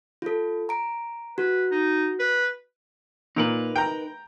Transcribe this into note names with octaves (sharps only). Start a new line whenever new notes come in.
F4 A4
A#5 D7
F#4 B4
D#4
B4
A#2 D#4 A#4 B4
G5 A#5